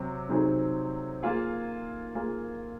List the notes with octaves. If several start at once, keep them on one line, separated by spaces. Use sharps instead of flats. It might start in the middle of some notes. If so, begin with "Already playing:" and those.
Already playing: C3 F#3 C4
C3 F#3 C4 D#4 G#4
A#3 F4 G#4
A#3 F4 G#4